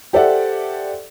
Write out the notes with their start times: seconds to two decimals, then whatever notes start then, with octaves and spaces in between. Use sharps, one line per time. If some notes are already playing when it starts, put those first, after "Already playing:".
0.13 G4 A4 C5 D5 E5 F#5